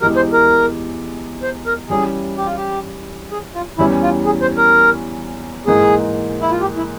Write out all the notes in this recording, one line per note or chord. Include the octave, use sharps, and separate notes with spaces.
E2 E3 G#3 E4 G4 A#4
C5
A#4
C5
A#4
E3 G3 C#4 E4 G#4
G4
F4
G4
G#4
F4
E2 E3 G3 C#4 E4
F4
G#4
C5
A#4
G#2 E3 A#3 G#4
E4
F4
G4
E4